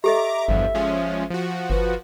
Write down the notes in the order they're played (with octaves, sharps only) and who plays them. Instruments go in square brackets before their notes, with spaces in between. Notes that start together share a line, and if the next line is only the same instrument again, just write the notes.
[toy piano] G4 A4 D#5 [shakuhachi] E5 [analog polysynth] A#5 D6
[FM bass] G#1 [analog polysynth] E2 G2 F3
[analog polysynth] F3 G#3 C#4
F3 F#4
[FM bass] G1 [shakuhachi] B4